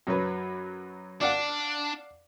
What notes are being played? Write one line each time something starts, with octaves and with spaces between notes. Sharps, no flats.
F#2 F#3 B4
D4 D5 F5 F#5